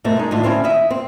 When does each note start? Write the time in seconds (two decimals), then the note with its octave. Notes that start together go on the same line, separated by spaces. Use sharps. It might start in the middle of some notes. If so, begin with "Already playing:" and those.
0.04 G#2 B2 A3 A#3 C4
0.17 G#3 D#4
0.31 D#2 A2 E3 D4 F4 F#4
0.43 D2 C4 C#4 E4
0.64 D#2 E4 D#5 E5
0.90 C4